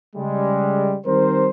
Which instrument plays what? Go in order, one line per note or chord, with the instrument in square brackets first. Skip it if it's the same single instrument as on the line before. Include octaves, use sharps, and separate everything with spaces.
[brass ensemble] C#3 G3 G#3
D#3 G3 C4 A#4 C5